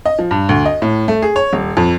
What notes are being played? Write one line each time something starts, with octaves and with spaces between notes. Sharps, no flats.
D#5
F3
G2
D2
D#5
A2
A3
G#4
C#5
D#1
F2